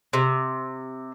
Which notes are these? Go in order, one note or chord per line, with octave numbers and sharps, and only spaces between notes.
C3